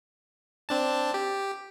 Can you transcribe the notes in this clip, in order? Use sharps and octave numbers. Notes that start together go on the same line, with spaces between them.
C4 D4 A5
G4